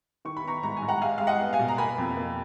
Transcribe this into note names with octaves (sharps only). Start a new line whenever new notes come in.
D#3 C#6
B5
B3 A#5 C#6
G#2 A#5
G#5
G#2
F#5 A#5
G#3 F5 G#5
G#3 F5
D#5 F#5
B3
F5 G#5
B2
A#5
A#3 G#5 B5
F2
A#3